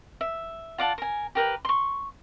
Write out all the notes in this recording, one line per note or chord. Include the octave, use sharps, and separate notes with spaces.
E5
F4 D5 F#5 A5
A#4 G#5
G4 A#4 B4 G5
C6 C#6